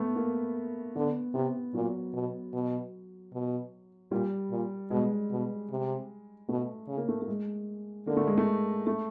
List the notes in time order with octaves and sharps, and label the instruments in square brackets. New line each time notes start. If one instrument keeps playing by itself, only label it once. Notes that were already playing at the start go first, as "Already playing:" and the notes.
Already playing: [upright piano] A3 B3
A#3
[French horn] D3 [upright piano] B3
[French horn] C3 [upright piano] B3
[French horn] A#2 [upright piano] F#3
[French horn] B2
B2
B2
[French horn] A#2 [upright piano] G3
[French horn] A#2
[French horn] B2 [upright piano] G#3
[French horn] B2
C3
[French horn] B2 [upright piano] A3
[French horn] C#3
[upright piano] A#3
A3
A3
G#3
[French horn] D3 [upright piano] A#3
[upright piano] A3
G#3
A3
A3